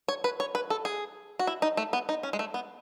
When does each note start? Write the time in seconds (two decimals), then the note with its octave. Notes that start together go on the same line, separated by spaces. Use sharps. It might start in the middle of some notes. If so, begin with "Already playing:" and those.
0.08 C#5
0.24 B4
0.40 C#5
0.55 B4
0.70 A4
0.85 G#4
1.39 F#4
1.47 E4
1.62 D#4
1.77 A3
1.93 B3
2.09 D#4
2.23 C#4
2.33 G#3
2.39 A3
2.54 B3